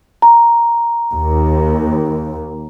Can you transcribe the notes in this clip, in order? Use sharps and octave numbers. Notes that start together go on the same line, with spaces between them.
A#5
D#2